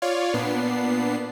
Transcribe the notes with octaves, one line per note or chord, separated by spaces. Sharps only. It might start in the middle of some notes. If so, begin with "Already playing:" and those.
F4 C#5 D5 F5
A#2 B3 D4 C7